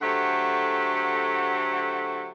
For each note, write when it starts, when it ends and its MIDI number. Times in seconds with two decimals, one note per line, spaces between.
0.02 2.29 50
0.02 2.29 54
0.02 2.29 57
0.02 2.29 67
0.02 2.29 72
0.02 2.29 78